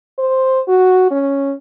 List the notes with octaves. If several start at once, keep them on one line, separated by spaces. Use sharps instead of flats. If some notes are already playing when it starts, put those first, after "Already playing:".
C5
F#4
C#4